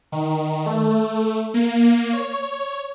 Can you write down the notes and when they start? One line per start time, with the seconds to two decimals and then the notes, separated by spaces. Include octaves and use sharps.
0.12 D#3
0.66 A3
1.54 A#3
2.13 C#5